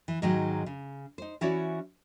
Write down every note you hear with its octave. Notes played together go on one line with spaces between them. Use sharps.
E3
G#2 D#3 F#3 G#3
C#3
D#4 C5
E3 C#4 E4 F#4 C#5 D5